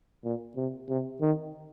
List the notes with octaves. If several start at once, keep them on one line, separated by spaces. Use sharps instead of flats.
A#2
C3
C3
D#3